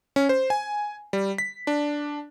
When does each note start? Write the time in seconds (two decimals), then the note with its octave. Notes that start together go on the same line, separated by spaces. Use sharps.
0.16 C#4
0.29 C5
0.50 G#5
1.13 G3
1.38 B6
1.67 D4